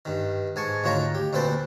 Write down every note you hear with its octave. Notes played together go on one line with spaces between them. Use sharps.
G2 D#3
G#2 G#5 A5 C#6
D2 D#3 F4 C#5 A5 A#5
G4
D2 A#2 C4 B4 C5 A5